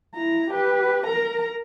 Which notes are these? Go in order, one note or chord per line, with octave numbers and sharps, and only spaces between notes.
E4 A#5
G4 B4
A#4 A#5